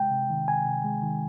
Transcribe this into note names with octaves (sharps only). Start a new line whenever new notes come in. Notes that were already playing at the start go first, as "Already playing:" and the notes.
Already playing: C3 G#3 G5
C3
D#3
C3 G#5
C3
G#3
D#3